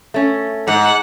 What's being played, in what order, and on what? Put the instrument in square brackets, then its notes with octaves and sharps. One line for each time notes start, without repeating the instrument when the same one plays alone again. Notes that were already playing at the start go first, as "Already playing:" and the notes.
[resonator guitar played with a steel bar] A3 C#4
[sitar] G#2 [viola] F#5